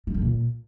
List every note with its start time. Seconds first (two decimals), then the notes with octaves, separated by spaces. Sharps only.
0.07 G3
0.14 D3
0.22 A#2